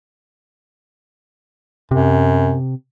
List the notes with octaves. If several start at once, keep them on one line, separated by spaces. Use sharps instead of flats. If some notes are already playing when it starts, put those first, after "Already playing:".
F#2 C3